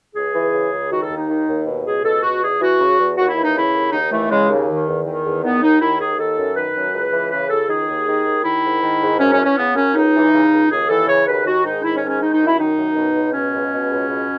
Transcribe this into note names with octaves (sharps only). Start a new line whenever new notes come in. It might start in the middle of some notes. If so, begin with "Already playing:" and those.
C#2 G#4
E3
C#3
C#2
D#3 F#4
A4
D#2
D#4
D#3
D#2
B2
C#2 G#4
B2 A4
C#2 F#4
E2 G#4
E3 F#4
C#3
E2
D#2 F#4
E4
E3
D#4
C#3 E4
D#2
D#2 D#4
E3 A3
C#3 G#3
D#2
D#3
E2
D#3
E2
D#3 B3
D#2 D#4
D#3 E4
D#2 G#4
D#3 A4
F#2
D#3 B4
F#2
C#2
E3
C#3 B4
C#2 A4
D#3 G#4
D#2
D#3
D#2
D#3 E4
G#2
D#3
G#2
F#2 C#4
C#4
E3
C#4
C#3 B3
F#2 C#4
C#2 D#4
E3
C#3
C#2
D#2 G#4
E3 A4
C#3 C#5
D#2 B4
D#3 F#4
G#2 D#4
D#3 E4
C#4
G#2
C#4
D#3 D#4
D#4
F#2
E4
D#3 D#4
F#2
B2
C#2
B2 C#4
C#2
B2
C#2
B2